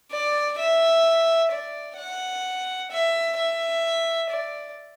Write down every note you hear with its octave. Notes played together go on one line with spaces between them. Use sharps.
D5
E5
D5
F#5
E5
E5
D5